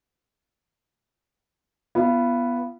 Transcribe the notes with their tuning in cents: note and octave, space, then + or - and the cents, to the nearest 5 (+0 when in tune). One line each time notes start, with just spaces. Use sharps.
B3 -5 F4 -40